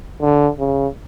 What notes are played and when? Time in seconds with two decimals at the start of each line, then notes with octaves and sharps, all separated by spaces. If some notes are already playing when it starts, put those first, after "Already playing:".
0.21 D3
0.59 C#3